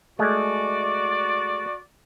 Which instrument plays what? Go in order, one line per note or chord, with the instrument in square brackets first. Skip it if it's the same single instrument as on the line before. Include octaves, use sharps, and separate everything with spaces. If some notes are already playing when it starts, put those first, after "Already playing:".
[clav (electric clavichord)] G#3 A3 [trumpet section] F#4 D5